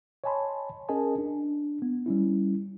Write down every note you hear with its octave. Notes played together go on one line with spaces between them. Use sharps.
C#5 D#5 G#5 A5 B5 C6
C#4 G#4 A#4 D#5 G#5 A5
D4
B3
G3 C#4 E4